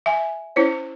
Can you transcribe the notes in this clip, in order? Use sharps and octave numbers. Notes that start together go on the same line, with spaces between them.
E5 G#5
C#4 E4 C5 C#5